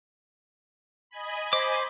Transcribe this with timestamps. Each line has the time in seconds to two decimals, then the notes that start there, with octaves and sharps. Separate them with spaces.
1.10 D#5 G#5 B5
1.53 C5 D6